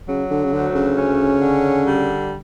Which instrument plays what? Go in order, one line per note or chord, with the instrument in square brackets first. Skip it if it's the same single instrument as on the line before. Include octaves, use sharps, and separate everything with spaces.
[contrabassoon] C#3 [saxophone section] F#3
[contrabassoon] D3
C#3
[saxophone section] D2 [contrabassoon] D3
[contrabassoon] C#3
[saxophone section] C#4
D3
G3